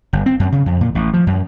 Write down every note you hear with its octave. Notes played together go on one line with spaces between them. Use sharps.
G1
C4
F#2
C#3
F2
A#2
A1
F3
F#2